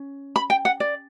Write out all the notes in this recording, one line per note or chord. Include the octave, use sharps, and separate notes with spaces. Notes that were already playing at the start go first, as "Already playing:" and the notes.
Already playing: C#4
B5
G5
F#5
D5